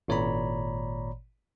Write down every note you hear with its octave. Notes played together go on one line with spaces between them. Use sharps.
G#1 A#2 C#5 D5 A#5 B5